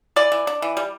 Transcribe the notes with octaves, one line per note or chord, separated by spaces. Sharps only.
E3 D5
E3
D4
E3
G3